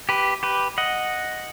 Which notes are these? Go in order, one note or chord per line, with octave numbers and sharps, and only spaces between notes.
G4 B4
G4 B4
D#5 F#5